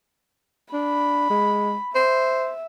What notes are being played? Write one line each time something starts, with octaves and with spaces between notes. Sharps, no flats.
D4 B5
G#3
C5 E5